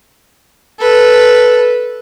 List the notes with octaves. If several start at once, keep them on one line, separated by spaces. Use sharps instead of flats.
A4 B4